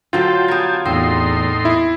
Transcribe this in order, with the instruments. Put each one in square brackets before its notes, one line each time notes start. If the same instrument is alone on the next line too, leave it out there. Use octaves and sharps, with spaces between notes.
[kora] D3 F#3 C5 [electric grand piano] F4 [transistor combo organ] G5 A5
[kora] B3 A#4 [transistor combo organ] G4 G#5 A5
[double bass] E2 [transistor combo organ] A2 D#4 C6 [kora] C4
[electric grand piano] E4